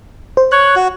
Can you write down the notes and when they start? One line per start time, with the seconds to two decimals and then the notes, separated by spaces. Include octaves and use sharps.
0.37 C5
0.52 C#5 F#6
0.76 F#4